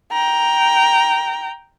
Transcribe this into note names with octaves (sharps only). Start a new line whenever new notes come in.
G5 A#5